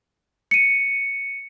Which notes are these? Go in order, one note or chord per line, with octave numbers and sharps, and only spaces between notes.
C#7 D#7